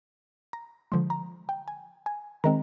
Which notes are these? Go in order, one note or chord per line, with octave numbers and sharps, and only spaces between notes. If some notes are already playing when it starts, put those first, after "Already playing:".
A#5
D3 F3 G#3 C6
A#5
G5
G#5
G#5
D#3 G#3 C4 A#5